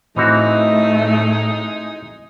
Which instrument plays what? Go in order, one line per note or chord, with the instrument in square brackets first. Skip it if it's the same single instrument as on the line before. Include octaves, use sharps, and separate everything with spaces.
[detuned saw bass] A2 [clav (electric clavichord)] E3 C4 F#4 [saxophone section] G#3 D#4 [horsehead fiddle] A3